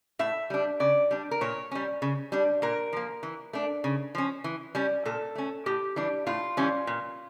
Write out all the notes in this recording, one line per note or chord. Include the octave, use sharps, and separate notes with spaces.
A2 E5
G3 D4
C#3 D5
G3 D4
A#4
A#2 C#5
G3 C#4
C#3
G3 D4
A#2 A#4
F3 A#3
E3
A3 D4
C#3
F3 C#4
E3
G3 C#4
A#2 A4
A3 C#4
A2 G4
E3 G3 D4
A2 F4
E3 G3 C#4
A#2